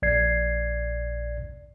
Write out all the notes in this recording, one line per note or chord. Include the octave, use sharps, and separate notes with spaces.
A#1 D5 G#6 C7